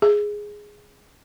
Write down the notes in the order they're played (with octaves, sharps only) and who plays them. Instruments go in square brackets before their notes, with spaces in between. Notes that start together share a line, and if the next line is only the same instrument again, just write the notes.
[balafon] G#4